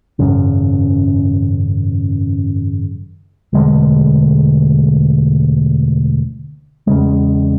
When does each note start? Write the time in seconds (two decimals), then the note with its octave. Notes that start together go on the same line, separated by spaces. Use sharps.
0.19 G#1 F#2 C#3
3.53 E1 D2 D3 G#3
6.87 E2 C#3 G#3